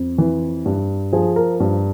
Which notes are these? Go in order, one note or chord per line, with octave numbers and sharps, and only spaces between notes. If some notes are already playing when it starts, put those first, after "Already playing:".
Already playing: F2
E3
G2
F3 G#4
A#4
G2